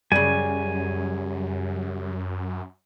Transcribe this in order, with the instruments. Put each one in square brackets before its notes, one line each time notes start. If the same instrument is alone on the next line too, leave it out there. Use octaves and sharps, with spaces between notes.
[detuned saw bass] F#2 [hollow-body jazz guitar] C#3 G3 [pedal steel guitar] G#5